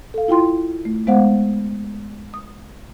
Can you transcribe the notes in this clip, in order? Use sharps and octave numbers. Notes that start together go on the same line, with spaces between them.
A4 F5
E4 F4 G5 C6
A3
G#3 B3 C5 F5 F#5
D#6